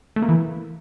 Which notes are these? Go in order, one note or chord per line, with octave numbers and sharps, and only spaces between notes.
A3
A#3
E3